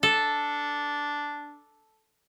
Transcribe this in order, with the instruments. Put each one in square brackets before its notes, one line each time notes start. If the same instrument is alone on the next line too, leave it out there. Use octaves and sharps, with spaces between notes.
[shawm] D4 [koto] A4